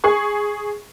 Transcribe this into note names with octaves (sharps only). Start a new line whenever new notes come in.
G#4 C#6